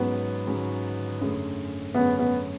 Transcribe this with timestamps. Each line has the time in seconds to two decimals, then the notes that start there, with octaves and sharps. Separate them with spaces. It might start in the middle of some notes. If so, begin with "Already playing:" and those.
Already playing: G#2 F#3 B3 C#4
0.47 G#2 F#3 C#4
1.21 F#2 D3 A3 C#4 G#4
1.94 F#2 D3 A3 B3 C#4 G#4
2.19 B3